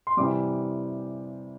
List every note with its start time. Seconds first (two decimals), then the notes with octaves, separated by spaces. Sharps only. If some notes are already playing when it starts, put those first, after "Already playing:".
0.07 C6
0.17 C3 E3 G3 D6